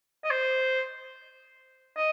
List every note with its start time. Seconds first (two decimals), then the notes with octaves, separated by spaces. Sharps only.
0.24 D#5
0.30 C5
1.97 D#5